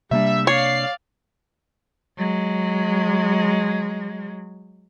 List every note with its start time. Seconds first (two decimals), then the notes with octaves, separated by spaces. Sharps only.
0.11 C3 G3 A#3 D4 E5
0.47 C#5 D5 F5 C7
2.18 F#3 G#3